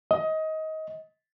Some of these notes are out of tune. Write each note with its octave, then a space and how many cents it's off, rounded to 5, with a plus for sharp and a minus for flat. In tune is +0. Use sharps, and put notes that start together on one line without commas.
D#5 +20